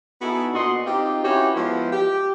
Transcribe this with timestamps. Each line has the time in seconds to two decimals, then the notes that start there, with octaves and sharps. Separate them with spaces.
0.21 B3 D#4 E4 F#4 G#4 A4
0.53 A#2 B3 D4 F#4 D#5 C6
0.86 C4 D#4 F4 G4
1.24 C#4 E4 F#4 G4 B4 C#5
1.55 F3 G#3 B3 E4 F4
1.92 G4